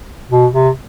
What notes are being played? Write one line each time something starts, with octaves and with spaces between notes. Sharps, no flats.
B2
C3